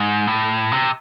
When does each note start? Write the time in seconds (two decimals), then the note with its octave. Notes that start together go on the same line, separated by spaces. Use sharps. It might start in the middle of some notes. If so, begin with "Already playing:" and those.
Already playing: G#2
0.27 A2
0.72 C3